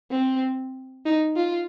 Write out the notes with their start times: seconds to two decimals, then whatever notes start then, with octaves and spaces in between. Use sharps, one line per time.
0.11 C4
1.05 D#4
1.36 F4